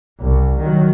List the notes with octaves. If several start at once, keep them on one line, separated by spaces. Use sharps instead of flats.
C2
D#3 F#3